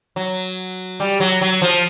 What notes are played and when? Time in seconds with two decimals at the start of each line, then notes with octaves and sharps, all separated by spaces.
0.16 F#3
1.00 G3
1.20 F#3
1.41 F#3
1.62 F3